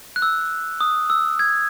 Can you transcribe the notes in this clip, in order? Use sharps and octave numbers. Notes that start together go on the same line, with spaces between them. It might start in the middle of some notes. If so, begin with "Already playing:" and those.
F#6
E6
D#6
E6
G#6